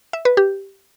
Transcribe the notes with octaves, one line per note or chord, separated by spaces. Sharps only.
E5
B4
G4